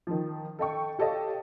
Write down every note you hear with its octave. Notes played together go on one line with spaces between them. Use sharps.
D#3 F3
A4 D#5 G5 C#6
G4 A4 C#5 D#5 F5